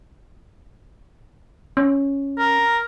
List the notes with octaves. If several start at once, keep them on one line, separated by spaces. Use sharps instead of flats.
C#4
A#4